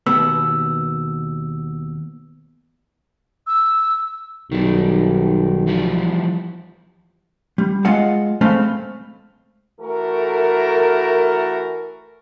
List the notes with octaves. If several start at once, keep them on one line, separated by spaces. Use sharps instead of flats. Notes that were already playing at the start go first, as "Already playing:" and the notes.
D#2 B2 B3 E6
E6
B1 D#3 G3
E3 F3 G3
G3
G#3 F4 D#5 F5 F#5
G#3 A3 C4 F5 B5
E3 A3 F#4 A4 A#4